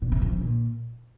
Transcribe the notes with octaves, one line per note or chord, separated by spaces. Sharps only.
A#2
C3
F2
C#3
A#2